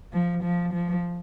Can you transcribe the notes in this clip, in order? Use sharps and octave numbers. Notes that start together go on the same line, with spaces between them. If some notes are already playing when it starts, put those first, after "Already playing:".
F3
F3
F3